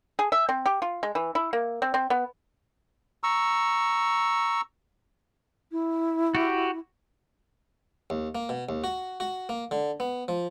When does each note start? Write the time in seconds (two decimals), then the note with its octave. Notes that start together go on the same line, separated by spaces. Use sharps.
0.19 G#4
0.32 E5
0.49 C4
0.66 G4
0.82 F4
1.03 G#3
1.15 E3
1.35 E4
1.53 A#3
1.82 C4
1.94 C4
2.10 B3
3.23 A#5 C#6 E6
5.72 E4
6.35 F#4 G4
8.10 D#2
8.35 A#3
8.49 B2
8.69 D#2
8.84 F#4
9.20 F#4
9.49 A#3
9.71 D3
10.00 B3
10.28 F3